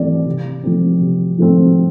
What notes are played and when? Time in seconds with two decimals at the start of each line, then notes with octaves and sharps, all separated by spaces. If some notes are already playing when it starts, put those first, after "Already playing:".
Already playing: E3 A3 C4 D5
0.26 C3
0.64 F3 A3 C4
1.01 C3
1.38 F3 A3 C4